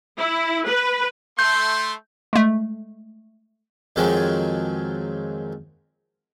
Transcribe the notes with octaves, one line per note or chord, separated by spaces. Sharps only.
E4
B4
A3 C6 G6
G#3 A3
F2 D#3 F3 F#3 G#3 C4